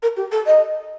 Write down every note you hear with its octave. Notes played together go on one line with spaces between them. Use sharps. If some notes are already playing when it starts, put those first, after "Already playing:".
A#4
G4
A4
D#5